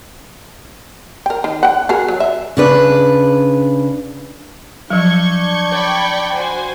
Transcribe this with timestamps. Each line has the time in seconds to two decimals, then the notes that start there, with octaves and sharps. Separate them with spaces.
1.26 A#4 G5
1.44 D#3
1.63 F#5 G5
1.89 F#4 G#4 A#4
2.08 F#3
2.20 E5
2.57 C#3 D4 B4
4.90 F3 F#3 D4 C#6 G6 G#6
5.71 D5 G5 B5
6.33 F#4 C5 G#5